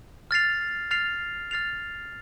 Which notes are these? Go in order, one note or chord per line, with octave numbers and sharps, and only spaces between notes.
F6 A6 C7 F7
F6 A6 C7 F7
F6 A6 C7 F7